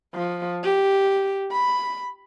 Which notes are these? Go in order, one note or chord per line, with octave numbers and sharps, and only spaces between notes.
F3
G4
B5